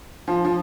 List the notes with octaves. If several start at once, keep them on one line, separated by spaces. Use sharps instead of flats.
F3
F3